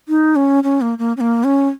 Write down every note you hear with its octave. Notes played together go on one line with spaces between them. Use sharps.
D#4
C#4
C#4
A#3
A#3
C#4
A#3
C#4